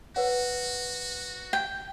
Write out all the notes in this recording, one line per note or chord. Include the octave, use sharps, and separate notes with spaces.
F#4 B4 C#5 F#5
G5